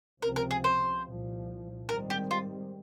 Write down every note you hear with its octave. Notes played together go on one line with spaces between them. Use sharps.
C#2 C3 F3 C4 A#4
A#4
G#4
C5
C2 A#2 F3
G#2 D#3 G3 C4 A#4
G4
F4